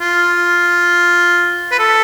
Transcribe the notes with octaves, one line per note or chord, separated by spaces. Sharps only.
F4
B4
A4